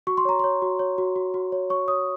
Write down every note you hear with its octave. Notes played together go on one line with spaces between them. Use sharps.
F#4 C#6
C6
C#5 A#5
C#5 C6
F#4
C#5
F#4
F#4
F#4
C#5
C#5 C#6
C#5 D#6